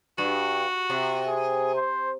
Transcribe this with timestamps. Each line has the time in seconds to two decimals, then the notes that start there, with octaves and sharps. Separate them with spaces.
0.18 G2 F#4
0.90 C3
1.27 G#4
1.75 C5